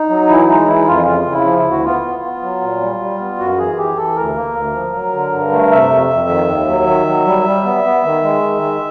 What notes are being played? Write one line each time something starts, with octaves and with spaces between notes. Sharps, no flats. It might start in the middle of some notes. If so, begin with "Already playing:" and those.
Already playing: D#4
F#3
E3 E4
G#3 D#4
E3 E4
F2 F4
C#3 F4
C#3
E4
F3
E4
D2
F#4
B3 F4
B3
B3
F#3
A#2
G3
G3
B3
F#2 F#4
E3 G#4
E3 G4
E3 A4
D2 A#4
A#3
D2
F3
F#3
D3
G2
A3
C3 E5
F2
F2
D#3
D#2
F#3
D#3
F#3
G3
G3
B3
B3
D#3
G#3
D#3
G#3